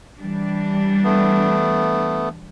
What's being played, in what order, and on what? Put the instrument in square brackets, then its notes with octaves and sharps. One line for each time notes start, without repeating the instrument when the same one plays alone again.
[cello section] E3 G3 D4
[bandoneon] A3 B3